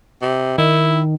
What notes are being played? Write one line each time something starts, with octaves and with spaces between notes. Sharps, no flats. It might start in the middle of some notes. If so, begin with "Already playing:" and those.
C3
D#3 E4